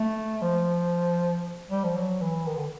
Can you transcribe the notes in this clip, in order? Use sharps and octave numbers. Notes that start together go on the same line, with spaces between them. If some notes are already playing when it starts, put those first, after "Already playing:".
Already playing: A3
F3
G3
F3
F#3
E3
D#3
D3